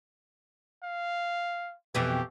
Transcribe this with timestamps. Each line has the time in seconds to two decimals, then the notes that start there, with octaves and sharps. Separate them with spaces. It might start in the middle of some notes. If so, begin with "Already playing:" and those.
0.83 F5
1.95 F2 B2 E3 G4